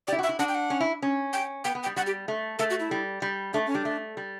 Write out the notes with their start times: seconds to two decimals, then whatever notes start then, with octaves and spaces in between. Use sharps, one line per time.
0.07 E4 G4 D5
0.19 F#4 E5
0.29 E4
0.39 D4 F#5
0.48 G5
0.55 F#5
0.70 C#4
0.80 E4
1.02 C#4
1.33 G5
1.64 B3 G5
1.75 B3
1.83 G5
1.86 G3
1.96 G3 F#5
2.07 G4
2.28 A3
2.59 A3 A4
2.70 F#4
2.80 E4
2.91 G3
3.22 G3
3.53 A3 D4
3.67 C#4
3.75 G3 D4
3.85 A3
4.17 G3